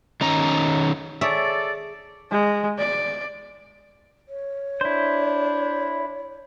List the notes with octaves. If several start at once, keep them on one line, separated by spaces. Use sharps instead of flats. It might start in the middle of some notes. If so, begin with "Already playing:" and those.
D#3 C#4 A#5
G#4 A4 C#5 D5 E5
G#3
D5
C#5
D4 E4 C5